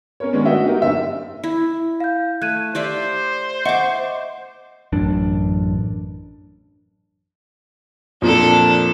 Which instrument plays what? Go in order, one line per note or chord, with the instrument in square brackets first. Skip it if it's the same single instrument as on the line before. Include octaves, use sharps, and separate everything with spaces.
[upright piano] C#4 A#4 C#5
D#3 G#3 B3 C#4 D4
A3 D4 F#4 D#5 E5 G5
D#4 F#4 G4 A#4
F#1 D3 E5
[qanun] E4
[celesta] F5 G6
[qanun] A3 [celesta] F#6 G#6 D#7
[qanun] G4 D5 E5 [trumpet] C5
[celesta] D#5 E5 F#5 [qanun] C#6 D6
[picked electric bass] A1 F#2 D4
[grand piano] F2 A#2 [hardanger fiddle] D4 A4